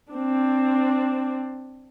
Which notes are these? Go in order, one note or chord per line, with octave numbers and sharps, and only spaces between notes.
C4 D4